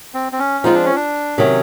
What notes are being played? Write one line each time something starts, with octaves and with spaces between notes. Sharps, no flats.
C4
C4
C#4
F3 G#3 C4 D#4 F4
D4
C#4
D4
C3 D#3 F#3 C#4